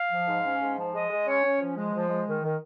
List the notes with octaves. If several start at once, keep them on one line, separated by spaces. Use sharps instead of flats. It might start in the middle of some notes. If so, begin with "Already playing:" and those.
Already playing: F5
F3
G#2
C#4
G#2
F3
G#3 D#5
G#3
C#4 C#5
C#4
F3
G#3
F3
G#3
D#3
D#3